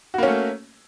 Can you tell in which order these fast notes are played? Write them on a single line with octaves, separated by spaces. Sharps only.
F#4 A#3 C#4 A3